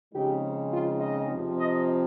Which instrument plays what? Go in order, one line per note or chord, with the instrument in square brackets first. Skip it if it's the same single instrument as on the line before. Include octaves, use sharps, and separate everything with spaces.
[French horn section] C#3 F3 G#3 C4 D#4 G4
F4
D#5
F2 C3 F3 C4
D#5